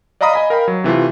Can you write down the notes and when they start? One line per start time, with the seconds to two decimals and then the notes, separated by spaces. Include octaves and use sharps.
0.21 D5 D#5 F5 A#5 B5 D#6
0.34 D#5 G#5 B5
0.50 A#4 F5 G5 B5
0.68 F#3
0.84 C3 E3 A3 F4